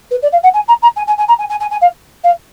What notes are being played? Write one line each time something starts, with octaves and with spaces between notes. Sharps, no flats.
B4
D5
F5
F#5
G#5
A#5
A#5
G#5
G#5
G#5
A#5
G#5
G#5
G#5
G#5
F5
F5